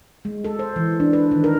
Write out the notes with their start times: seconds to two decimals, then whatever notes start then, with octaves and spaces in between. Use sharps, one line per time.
0.25 G#3
0.44 A4
0.59 C5
0.76 E3
1.00 D4
1.13 B4
1.31 D#3
1.44 A#4